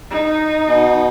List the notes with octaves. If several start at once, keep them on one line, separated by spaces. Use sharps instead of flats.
D#4
B2